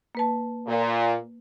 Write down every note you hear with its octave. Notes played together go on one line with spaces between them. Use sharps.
A#3 B4 A5
A#2